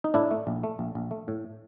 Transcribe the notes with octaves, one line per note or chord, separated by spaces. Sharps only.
D#4
A2 D4 E4
A3
A#1
A3
A#1
A#1
A3
A2